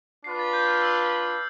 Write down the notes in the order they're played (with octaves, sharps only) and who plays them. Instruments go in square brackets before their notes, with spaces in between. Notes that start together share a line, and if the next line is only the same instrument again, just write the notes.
[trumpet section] D4 F4 B4 [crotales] C7
[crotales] A6
G6
F6
E6